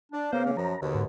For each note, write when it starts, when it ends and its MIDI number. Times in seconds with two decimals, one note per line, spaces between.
0.13 0.32 62
0.33 0.43 49
0.33 0.43 58
0.33 0.51 59
0.33 0.43 72
0.33 0.51 77
0.45 0.57 49
0.45 0.57 58
0.57 0.75 42
0.57 0.75 53
0.57 0.81 82
0.81 1.04 39
0.81 1.04 47
0.81 1.04 50
0.94 1.05 44